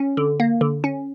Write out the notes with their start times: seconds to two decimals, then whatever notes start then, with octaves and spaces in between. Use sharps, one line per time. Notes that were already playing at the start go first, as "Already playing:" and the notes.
Already playing: C#4
0.17 D3
0.40 A#3
0.61 D3
0.84 C#4